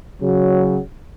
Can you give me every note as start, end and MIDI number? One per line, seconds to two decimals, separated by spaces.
0.21 0.78 49
0.21 0.78 54